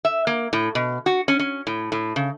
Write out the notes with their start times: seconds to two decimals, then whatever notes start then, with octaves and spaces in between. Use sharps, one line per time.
0.05 E5
0.27 A#3
0.53 A2
0.75 B2
1.06 F#4
1.28 C#4
1.39 C#4
1.67 A2
1.92 A2
2.16 C#3